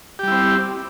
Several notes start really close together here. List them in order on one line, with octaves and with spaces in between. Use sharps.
G4 G3 E4 C4